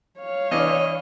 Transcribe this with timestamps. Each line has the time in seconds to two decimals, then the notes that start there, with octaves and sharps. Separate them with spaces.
0.19 C#5 F5
0.51 E3 D4 D#5